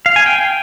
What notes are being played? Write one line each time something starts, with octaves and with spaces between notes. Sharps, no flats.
F5
G#5
G5